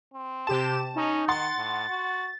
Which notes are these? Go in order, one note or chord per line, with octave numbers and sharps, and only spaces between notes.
C4
C3 G4 A5 E7
C#4 D#4
D#3 F#5 C6 A6
A2
F#4